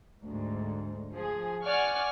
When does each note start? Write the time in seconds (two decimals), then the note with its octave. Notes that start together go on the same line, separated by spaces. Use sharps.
0.23 D2 G#2
1.12 F3 G#4
1.64 D5 F#5 G#5 C#6 F6